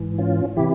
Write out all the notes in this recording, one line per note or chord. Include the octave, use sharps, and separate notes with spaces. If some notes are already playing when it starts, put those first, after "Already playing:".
Already playing: G#2 E3
C#4 F4
C3 E3 E4 G4